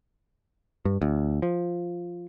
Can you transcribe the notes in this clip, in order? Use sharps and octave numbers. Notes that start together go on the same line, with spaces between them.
G2
D2
F3